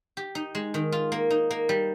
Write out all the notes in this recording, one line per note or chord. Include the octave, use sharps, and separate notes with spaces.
G4
D#4
G#3
D#3
F4
A#3
D#4
A#3
G3